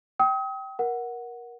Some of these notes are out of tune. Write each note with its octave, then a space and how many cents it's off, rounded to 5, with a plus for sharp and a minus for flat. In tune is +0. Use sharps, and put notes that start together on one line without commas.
G5 -15 D#6 +40
A#4 +20 F#5 +0